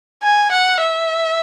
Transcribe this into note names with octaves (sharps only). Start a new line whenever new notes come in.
G#5
F#5
E5